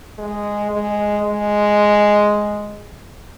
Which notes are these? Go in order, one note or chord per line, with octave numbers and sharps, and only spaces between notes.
G#3
G#3
G#3